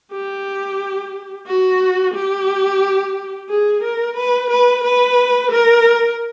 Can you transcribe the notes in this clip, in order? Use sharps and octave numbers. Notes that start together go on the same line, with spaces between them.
G4
F#4
G4
G#4
A#4
B4
B4
B4
A#4